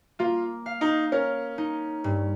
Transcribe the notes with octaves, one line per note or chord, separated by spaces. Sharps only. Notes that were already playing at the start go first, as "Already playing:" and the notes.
A#3 F4
F5
D#4
C#4 A#4
D#4
G2